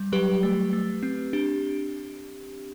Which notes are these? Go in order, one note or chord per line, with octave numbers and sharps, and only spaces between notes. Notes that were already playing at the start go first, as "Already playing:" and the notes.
Already playing: G3
F#3 G4 B4
A3
A3
C4
D4 G4